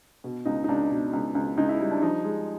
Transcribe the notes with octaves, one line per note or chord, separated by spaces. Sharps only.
B2
C#2 D#4
D#4
C#2 D4
B2
C#2
C#2
C#2 D#4
E4
G3
D4
F3 D#4
G#3